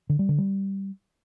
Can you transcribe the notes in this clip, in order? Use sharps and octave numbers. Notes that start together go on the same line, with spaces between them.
D3
G3
D3
G3